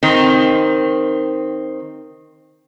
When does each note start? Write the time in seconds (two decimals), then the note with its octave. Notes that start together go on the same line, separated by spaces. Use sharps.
0.03 D#3 C4